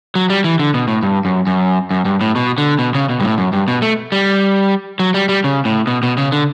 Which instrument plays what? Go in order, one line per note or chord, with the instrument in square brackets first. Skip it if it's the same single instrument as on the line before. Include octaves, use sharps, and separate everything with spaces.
[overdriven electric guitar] F#3
G3
E3
D3
B2
A2
G2
F#2
F#2
F#2
G2
A2
B2
D3
B2
C#3
B2
G2
A2
F#2
G2
B2
A3
G3
F#3
G3
G3
C#3
A2
B2
B2
C#3
D3